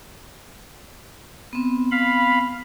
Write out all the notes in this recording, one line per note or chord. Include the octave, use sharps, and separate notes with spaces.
B3 C4
F5 B5